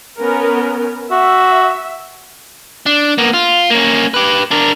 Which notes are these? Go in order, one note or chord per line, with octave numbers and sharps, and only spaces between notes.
B3 C#4 A#4
F#4 E5
D4
A#3 B3
F4
A#3 C#4
G4 B4
D4 A#4